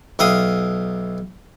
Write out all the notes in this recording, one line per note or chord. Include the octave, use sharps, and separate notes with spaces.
B1 E5 F5 G5 D#6